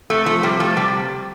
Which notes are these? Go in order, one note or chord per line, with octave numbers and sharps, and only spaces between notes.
C3 A3
F3 A3
C3 G3
F3 A3
C3 G3